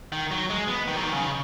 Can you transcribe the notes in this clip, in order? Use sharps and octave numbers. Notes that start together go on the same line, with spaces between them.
D#3
F#3
G#3
B3
D#3
F#3
D#3
C#3